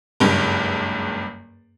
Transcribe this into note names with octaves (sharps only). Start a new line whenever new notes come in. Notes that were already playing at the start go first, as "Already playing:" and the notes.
F#1 C#2 G2